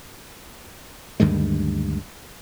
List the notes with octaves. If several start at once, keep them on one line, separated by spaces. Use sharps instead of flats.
D2 G2 D#3 G#3